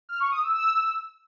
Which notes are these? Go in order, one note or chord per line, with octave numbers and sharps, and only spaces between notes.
F6
C#6
D#6
E6
E6